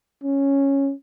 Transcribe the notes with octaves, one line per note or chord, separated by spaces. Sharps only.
C#4